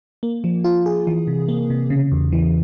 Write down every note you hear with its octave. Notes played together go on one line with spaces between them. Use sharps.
A#3
F3
F4
G#4
E3
C3
A#3
C3
C#3
E2
E3